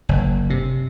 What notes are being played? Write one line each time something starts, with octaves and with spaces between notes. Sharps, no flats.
F#1
C3